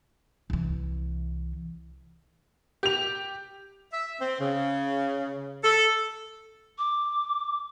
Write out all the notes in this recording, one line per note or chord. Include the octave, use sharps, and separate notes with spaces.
C2 E3
G4 F7
E5
C4
C#3
A4
D6